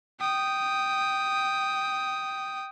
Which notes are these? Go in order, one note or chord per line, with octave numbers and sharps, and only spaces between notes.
G5 D#6